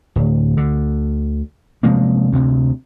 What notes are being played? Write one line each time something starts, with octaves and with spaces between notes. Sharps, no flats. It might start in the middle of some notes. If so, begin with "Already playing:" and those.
D1
D2 D3
C3 F3 G#3 A#3
D2 C3